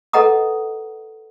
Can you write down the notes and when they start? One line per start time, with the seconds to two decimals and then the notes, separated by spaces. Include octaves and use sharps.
0.13 A4 B4 D#5 F#5 A#5 D#6